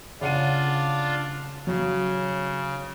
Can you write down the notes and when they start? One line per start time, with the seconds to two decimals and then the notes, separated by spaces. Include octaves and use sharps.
0.21 C#3 D4 F4 F#5 D#7
1.67 C#3 F#3